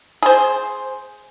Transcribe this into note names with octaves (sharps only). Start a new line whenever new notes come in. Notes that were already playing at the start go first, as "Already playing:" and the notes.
G#4 C5